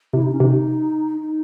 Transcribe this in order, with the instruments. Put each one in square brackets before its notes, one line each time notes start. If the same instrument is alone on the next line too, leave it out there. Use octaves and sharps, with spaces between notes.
[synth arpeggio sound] C3 [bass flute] E4
[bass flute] D#4
C#4
[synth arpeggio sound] C3 [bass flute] D#4
[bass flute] D#4